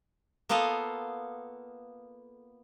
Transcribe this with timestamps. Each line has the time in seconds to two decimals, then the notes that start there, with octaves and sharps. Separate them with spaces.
0.49 A#3 B3 F4 A4 D#5 F5